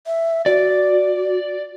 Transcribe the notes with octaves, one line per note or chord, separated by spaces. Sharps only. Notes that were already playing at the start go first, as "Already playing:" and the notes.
E5
F#4 D5